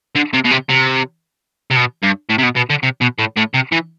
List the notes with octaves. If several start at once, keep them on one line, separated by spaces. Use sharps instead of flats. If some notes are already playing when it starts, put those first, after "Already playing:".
D3
C3
B2
C3
C3
C3
B2
G2
A2
C3
B2
B2
D3
C3
B2
A2
A2
C3
E3